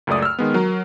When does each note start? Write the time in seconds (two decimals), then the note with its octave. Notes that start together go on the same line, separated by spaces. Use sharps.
0.07 C#2 F#2 A3 D5 D#6
0.22 E6 F6
0.39 D#3 G#3 B3
0.54 F#3 A#4